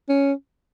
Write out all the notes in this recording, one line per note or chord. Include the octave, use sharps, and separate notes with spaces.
C#4